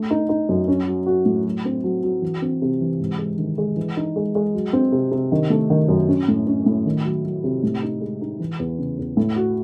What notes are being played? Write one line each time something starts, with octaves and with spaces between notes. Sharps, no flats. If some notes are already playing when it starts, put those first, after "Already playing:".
Already playing: A3
D#4
D#4
F#2
C#4
F#3
F#4
A2
F#3
C4
F#3
F#3
E3
C4
C3
E3
G#2
G#3
D#3
G#3
E3
D#4
G#3
G#3
F#3
C4
C3
C3
D#3
A3
D#3
F#2
C#4
A2
C#4
A2
D#3
F#3
F#3
C3
A2
D#4
G#3
D#4
E3
E2
C#3
E2
A2
F#4